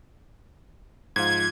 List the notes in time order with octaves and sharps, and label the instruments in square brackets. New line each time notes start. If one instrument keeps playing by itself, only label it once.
[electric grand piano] G#2 F3 F4 [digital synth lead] G#6